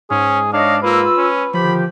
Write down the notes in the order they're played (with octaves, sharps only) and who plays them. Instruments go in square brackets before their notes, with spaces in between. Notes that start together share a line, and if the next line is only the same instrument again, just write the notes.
[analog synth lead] G#2 [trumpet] C#4 [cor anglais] G#4
[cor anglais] D4 [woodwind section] C#5 D#5 [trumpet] F5
[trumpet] A#3 [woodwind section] F4 E6 [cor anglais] B4
[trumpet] C#4
[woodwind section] D3 D#3 G4 [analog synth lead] F3 [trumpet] B5